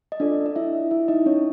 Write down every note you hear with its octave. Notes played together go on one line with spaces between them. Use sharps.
D#5
D4 F4 A4 D5
D#5
E4 E5
E4 E5
D#4 D#5
C#4 C#5